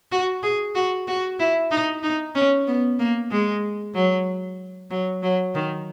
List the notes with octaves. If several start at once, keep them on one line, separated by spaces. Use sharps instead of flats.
F#4
G#4
F#4
F#4
E4
D#4
D#4
C#4
B3
A#3
G#3
F#3
F#3
F#3
D#3